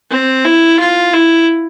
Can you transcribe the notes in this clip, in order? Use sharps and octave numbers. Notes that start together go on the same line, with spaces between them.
C4
E4
F4
E4